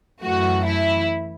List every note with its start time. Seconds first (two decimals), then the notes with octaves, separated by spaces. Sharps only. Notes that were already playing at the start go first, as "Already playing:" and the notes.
0.22 F#2 E3 A3 F#4
0.66 E4